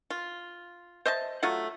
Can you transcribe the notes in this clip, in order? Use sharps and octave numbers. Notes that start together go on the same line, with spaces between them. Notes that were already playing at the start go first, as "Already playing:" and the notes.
F4
C5 D#5 E5 A5
F#3 A3 F4 F#5